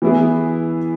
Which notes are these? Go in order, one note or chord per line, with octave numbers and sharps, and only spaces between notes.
E3 B3 E4 G#4